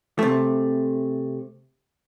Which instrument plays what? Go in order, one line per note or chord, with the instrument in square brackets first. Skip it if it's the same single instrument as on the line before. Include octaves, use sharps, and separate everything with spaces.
[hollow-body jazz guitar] C3 A3